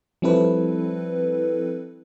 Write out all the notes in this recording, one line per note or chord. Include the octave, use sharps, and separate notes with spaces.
F3 G3 C4 E4 A4 B4